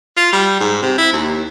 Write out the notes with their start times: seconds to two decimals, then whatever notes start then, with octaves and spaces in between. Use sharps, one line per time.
0.17 F4
0.32 G3
0.60 G#2
0.83 C3
0.98 E4
1.13 D#2